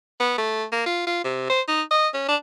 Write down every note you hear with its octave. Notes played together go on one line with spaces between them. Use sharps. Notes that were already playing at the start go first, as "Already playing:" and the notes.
B3
A3
A#3
F4
F4
C3
C5
D#4
D#5
C#4
D4